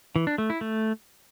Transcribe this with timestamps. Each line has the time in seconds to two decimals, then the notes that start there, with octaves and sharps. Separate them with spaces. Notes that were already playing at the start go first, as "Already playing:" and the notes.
0.16 E3
0.27 D4
0.38 A3
0.50 E4
0.61 A3